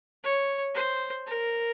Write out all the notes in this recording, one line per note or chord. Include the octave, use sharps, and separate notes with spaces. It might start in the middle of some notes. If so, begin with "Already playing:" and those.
C#5
C5
A#4